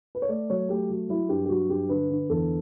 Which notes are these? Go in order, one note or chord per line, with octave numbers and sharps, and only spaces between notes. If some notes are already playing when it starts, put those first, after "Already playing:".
B4
C#5
A3 D5
F#3 C#5
A3 G4
F#3 F#4
F#3 E4
G2 G4
G4
F#3 F#4
G2 G4
D3 B4
D3
E2 A4